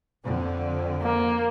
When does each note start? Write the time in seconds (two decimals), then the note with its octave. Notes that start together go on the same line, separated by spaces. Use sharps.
0.24 F2 D3
1.02 A#3